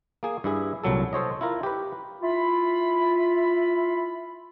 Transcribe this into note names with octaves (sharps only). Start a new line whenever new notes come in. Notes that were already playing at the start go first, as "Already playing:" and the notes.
A#3 G#4 G#5
G2 E4 G#4 E5
C2 A#2 F#3 A4
A4 C5 C#5 D#5
E4 F4 A#4
G4 B4
E4 F4 B5